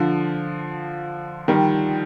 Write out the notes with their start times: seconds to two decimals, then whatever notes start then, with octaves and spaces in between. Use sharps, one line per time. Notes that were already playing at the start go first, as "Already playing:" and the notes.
Already playing: D3 F3
1.48 D#3 G3